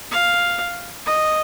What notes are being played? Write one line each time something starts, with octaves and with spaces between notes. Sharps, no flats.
F5
D#5